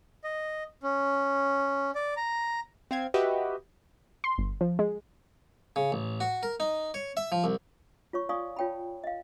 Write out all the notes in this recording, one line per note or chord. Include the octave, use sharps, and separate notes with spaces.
D#5
C#4
D5
A#5
C4 F5 G#6
F#4 G4 B4 D#5 E5
C6
G1
F3
G#3
C#3
A1
F#4
A#4
D#4
C#5
E5
F3
C2
F4 C#5 C#6
D5 F5 G#5 C6 C#6 D#6
F4 C#5 G5 A5 B5
D#5 F5